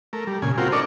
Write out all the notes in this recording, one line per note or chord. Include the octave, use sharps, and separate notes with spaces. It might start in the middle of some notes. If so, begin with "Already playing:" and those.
A3 A#4
G3
A#2 C#3 G#5
C4 F4 F#4 A#4 G5
D4 A4 A#4 D5 D#5 C#6